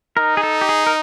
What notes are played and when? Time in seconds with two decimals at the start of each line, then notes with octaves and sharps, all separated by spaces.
0.17 D#4 A#4
0.37 G#4
0.43 A4
0.61 G4
0.69 G#4
0.86 A#4